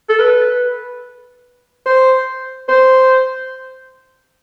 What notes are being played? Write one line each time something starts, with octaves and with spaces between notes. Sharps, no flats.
A4
B4
C5
C5